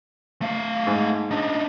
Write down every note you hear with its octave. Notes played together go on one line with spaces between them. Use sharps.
A3 F5
G#2
D4 D#4